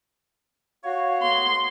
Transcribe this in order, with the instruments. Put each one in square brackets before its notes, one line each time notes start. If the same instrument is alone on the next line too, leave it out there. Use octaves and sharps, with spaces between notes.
[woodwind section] F#4 C#5 [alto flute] F5
[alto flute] B3 [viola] C6